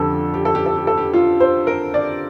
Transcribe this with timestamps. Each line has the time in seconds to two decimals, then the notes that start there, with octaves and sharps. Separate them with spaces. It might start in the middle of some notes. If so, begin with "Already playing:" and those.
Already playing: F2 D3 F3 G4 A4
0.34 G4
0.45 A4
0.55 G4
0.66 A4
0.77 G4
0.87 A4
0.98 G4
1.13 F4
1.40 C5
1.67 A#4
1.94 D5